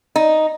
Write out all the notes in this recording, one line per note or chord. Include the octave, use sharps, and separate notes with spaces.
D#4